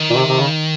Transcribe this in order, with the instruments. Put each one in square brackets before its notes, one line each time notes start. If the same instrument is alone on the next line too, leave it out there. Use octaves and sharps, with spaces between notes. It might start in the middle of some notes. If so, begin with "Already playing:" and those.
Already playing: [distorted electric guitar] D#3
[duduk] A#2
C3
C3
C#3